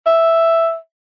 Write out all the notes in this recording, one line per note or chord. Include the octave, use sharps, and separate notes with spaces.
E5